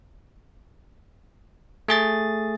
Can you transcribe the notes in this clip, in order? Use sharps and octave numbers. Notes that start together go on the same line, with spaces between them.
A3 G#4 A6